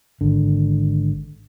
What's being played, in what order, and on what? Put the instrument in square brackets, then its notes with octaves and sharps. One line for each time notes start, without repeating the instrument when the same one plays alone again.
[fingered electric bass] G#1 D3